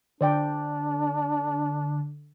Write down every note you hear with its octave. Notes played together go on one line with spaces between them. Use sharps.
D3 D4 C5 D5 G5